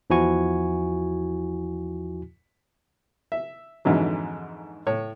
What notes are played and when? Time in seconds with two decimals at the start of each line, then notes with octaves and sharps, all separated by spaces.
0.10 E2 F3 E4 F#4 G#5 C#6
3.32 E5
3.85 F2 G#2 D3 E3 F#3
4.87 A2 C#5